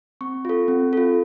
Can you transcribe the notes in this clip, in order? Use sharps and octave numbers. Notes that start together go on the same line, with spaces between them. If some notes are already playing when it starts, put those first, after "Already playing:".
C4 C#6
F4 A4
C4
F4 A4